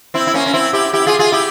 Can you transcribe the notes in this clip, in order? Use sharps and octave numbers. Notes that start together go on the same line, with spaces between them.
C4 E4
E4
A#3 C#4
C#4
C4 E4
E4 G4
E4 G4
F4 G#4
F4 G#4
E4 G4